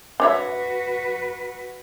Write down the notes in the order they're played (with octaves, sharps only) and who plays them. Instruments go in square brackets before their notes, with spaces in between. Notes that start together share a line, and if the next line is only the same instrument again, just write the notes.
[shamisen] D4 C#5 E5 [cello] F#4 B4